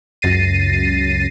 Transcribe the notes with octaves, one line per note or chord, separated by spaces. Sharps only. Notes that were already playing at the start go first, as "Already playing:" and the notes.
C#2 F#2 A6 A#6 C7 D#7